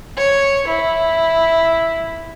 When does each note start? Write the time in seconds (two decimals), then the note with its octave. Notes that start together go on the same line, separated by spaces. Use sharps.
0.18 C#5
0.68 E4